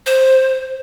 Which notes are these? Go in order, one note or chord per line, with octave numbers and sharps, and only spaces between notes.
C5